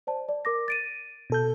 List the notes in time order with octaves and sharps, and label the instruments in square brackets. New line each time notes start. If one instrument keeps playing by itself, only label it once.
[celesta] C5 D5 A5
D5
A#4 D6 A#6
A6 D7 D#7
[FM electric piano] B2 A4 G6